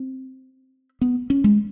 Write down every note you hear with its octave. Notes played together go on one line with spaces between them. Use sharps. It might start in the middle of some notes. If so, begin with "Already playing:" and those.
Already playing: C4
B3
C#4
G#3